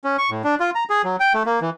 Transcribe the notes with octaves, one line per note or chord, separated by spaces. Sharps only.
C#4
C#6
A2
D4
F4
A#5
G#4
F#3
G5
A3
A#3
E3